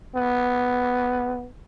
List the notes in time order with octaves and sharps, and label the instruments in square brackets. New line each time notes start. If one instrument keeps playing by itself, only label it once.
[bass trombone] B3